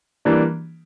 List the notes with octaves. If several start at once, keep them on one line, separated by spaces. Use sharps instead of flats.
E3 G3 A#3 D4